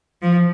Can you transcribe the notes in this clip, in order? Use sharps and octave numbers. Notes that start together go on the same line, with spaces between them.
F3